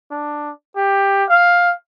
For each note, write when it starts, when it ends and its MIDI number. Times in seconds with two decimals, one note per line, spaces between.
0.11 0.50 62
0.76 1.24 67
1.29 1.74 77